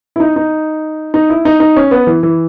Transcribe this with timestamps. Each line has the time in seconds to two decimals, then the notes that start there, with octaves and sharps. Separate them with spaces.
0.16 E4
0.20 D#4
0.36 D#4
1.14 D#4
1.30 E4
1.45 D#4
1.60 D#4
1.76 C#4
1.91 B3
2.07 E3
2.23 E3